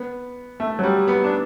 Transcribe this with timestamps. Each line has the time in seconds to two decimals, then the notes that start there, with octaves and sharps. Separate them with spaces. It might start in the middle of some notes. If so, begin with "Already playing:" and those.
Already playing: B3
0.60 A3
0.79 F#3
0.83 G3
1.08 B3
1.24 D4